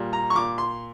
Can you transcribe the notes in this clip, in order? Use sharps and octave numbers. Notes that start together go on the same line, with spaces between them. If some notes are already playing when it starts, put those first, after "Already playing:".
Already playing: A#2 G3
A#5
C#6
A#2 D6
C6